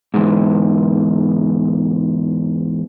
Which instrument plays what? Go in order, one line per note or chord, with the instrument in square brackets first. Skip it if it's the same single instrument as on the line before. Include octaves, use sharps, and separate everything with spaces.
[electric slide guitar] E2 G#2